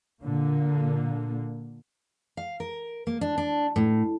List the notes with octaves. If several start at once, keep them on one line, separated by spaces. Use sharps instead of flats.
A#2 D3 A#3
F5
A#4
A#3
D4
D4
A2